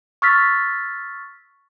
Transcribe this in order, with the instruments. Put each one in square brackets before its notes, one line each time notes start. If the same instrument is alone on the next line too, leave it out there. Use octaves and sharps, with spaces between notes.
[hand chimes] C#6 E6 F6 A6 B6